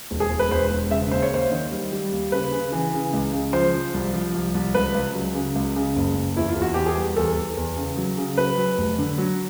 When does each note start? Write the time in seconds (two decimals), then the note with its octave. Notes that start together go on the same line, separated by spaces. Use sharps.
0.11 E1
0.20 G#4
0.30 E1
0.39 B4
0.51 E1 C5
0.71 E1
0.91 C#3 E5
1.11 D#2 C5
1.22 C#5
1.31 D#2 C5
1.51 D#3
1.72 G3
1.92 G3
2.12 D#2
2.32 C#3 B4
2.52 C#3
2.72 E3
2.93 C#3
3.13 C#2
3.33 C#3
3.53 F3 C5
3.73 F3
3.94 C2
4.14 F3
4.34 C2
4.54 C2
4.75 C#2 B4
4.94 C#2
5.15 F#3
5.35 C#3
5.55 C#2
5.76 C#3
5.96 F#1
6.15 F#1
6.36 E2 E4
6.49 F4
6.56 E2
6.62 F#4
6.74 E2 G4
6.86 G#4
6.97 G3
7.16 E2 A4
7.36 E2
7.57 E2
7.76 C#3
7.97 F#3
8.17 C#3
8.38 F#3 B4
8.57 F#3
8.78 F1
8.98 D3
9.18 F#3